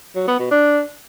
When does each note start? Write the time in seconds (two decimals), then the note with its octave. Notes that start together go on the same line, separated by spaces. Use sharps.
0.15 F#3
0.27 B3
0.39 B2
0.51 D4